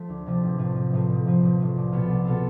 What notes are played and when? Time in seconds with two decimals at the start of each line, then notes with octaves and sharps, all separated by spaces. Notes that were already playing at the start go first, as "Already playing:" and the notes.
Already playing: F3 A3
0.09 D2
0.27 C3 F3 A3
0.43 A1
0.59 A2 F3
0.76 A1
0.93 A2 F3
1.10 A1
1.26 A2 F3
1.43 A1
1.59 A2 F3
1.76 C2
1.92 B2 B3 F4 A4
2.08 C2
2.25 B2 B3 F4 A4